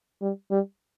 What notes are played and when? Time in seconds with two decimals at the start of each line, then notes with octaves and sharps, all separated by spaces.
0.22 G3
0.51 G3